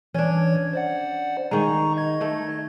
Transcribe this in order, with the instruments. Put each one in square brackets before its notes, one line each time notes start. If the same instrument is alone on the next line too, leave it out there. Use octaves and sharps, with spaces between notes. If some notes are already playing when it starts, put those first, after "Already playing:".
[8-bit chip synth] E3 C#5 G#6 [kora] C#4 D4
[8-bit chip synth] C5 D5 F#5
[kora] D#3 G#3 [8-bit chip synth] A#5 C#6
[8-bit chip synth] D#5 G#6
[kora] D#3 A3